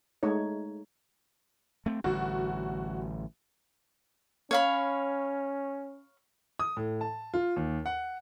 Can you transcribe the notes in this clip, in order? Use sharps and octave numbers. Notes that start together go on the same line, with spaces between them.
G#3 A3 D#4 C#5
A3 C4
A1 D3 G3 F#4
C#4 C#5 F5 B5
D#6
A2
A5
F4
D#2
F#5